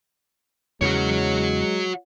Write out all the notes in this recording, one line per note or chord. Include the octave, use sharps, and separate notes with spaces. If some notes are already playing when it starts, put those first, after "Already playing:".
E2 C#3 G#3 F#4 C#5